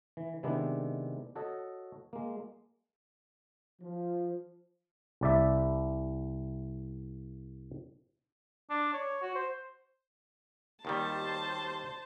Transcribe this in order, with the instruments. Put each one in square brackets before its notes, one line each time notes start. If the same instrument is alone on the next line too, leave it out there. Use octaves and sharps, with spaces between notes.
[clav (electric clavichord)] E3
C3 D#3 G#3 B3 D4 E4
F#4 A4 C#5 D#5
G#3 A#3
[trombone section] F3
[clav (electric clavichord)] C2 D5 E5
[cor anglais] D4
C#5
F#4
C5
[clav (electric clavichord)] D#2 D#3 G3 [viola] C5 A5